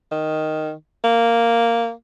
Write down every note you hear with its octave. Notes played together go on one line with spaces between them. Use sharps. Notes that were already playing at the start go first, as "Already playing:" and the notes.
D#3
A#3